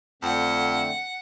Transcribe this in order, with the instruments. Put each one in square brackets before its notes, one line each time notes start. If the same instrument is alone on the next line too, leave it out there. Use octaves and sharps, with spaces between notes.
[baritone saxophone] F2 [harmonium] D3 A3 C4 [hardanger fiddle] F#5